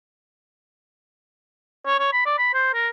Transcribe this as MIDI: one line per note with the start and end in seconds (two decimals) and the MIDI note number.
1.86 1.99 73
1.99 2.12 73
2.13 2.24 83
2.26 2.39 74
2.39 2.53 83
2.54 2.73 72
2.74 2.89 70